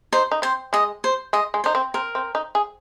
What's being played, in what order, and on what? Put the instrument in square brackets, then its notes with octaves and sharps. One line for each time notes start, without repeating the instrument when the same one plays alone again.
[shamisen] D#4 [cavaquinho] C5
[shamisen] D#4
[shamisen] C4 [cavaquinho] C5
[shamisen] G#3 [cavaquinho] D#5
[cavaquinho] C5
[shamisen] G#3 [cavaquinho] D#5
[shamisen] G#3
[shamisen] D#4 [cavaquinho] C5
[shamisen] C4
[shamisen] C4 [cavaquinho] A#4
[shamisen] C4
D#4
G#4